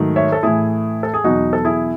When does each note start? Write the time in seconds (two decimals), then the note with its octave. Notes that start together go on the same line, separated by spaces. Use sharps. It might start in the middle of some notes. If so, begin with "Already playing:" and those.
Already playing: G#2 D#3 F#3 A3
0.16 C#5 E5
0.32 A4
0.43 A2 E3 A3 E4 G#4
1.03 A4
1.14 G#4
1.24 E2 B2 F#3 D#4 F#4
1.53 A4
1.65 E4 G#4